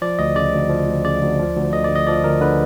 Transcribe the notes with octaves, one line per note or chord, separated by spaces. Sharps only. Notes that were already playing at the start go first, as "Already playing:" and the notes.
F3 D5
D2 D#5
C#3 D5
D2
F3
D2
C#3 D5
D2
F3
D2
D3 D#5
D5
D2
D#5
F3 D5
D2 A#4
D3 B4